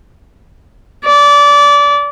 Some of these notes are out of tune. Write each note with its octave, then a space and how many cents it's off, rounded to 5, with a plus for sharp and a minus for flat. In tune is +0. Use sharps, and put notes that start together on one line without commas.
D5 -25